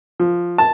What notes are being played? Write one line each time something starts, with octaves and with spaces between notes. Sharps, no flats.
F3
A5